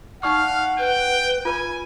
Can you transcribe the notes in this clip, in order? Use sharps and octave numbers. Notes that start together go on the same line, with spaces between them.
D#4 D5 F5 F#5 C#6 F6
B4 G5
F4 B4 G#5 B5